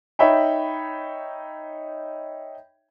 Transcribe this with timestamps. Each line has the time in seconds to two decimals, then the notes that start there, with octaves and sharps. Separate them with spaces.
0.19 D#4 C#5 E5 G5 B5